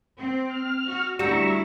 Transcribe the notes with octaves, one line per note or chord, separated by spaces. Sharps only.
C4
F6
F#4
D2 G3 E4 F#4 A#5 C#6 E6